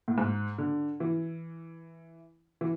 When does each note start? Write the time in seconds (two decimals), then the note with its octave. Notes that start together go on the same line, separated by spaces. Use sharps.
0.08 A2
0.18 G#2
0.58 D3
1.00 E3
2.61 E3